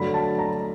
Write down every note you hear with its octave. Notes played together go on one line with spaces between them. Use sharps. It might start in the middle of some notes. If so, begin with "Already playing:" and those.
Already playing: G2 D3 F#3 A3 B5
A5
A#5